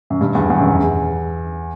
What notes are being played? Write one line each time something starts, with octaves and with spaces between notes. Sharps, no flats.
F#2
G2
E2
E2
F#2
E2